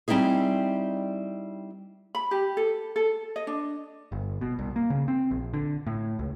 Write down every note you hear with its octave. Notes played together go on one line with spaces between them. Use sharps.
G3 C4 D#4 E4 G#4
B5
G4
A4
A4
D#5
D4
G1
B2
C2
A#3
C#3
C4
A#1
D3
A2
C#2